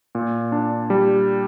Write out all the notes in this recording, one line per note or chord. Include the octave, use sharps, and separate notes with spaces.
A#2
D4
G3